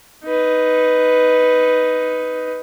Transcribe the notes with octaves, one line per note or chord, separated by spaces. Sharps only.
D#4 B4